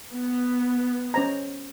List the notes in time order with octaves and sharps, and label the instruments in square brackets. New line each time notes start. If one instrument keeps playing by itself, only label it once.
[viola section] B3
[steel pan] C#4 C5 A#5